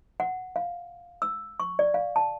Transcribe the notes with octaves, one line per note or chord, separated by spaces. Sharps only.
F#5
F5
E6
C#6
D5
F5
A5